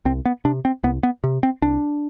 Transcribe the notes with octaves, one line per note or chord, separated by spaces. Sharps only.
C2 C4
B3
C3 D4
C4
C2 B3
B3
C3
C4
C2 D4